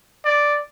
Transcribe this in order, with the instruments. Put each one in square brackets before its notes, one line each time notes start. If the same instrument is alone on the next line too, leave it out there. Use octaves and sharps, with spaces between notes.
[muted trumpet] D5